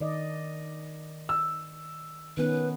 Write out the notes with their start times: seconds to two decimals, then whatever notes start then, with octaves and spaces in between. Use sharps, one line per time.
0.01 D#3 D5 D#5
1.29 E6
2.37 D#3 B3 C#4 B4